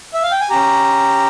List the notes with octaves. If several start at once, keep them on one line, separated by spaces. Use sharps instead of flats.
E5
F5
G5
G#5
C#4 G4 A#5